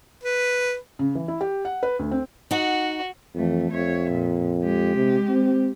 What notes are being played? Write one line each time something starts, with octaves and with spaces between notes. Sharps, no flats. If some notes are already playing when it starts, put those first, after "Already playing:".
B4
C#3
E3
E4
G4
F#5
B4
D2
C4
D#4 F#4 F#5
F2 E3 A3
F2 C#5 E5
A#2
G#3 G4
C3
C4